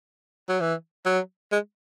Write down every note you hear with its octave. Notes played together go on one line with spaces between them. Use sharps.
F#3
E3
F#3
G#3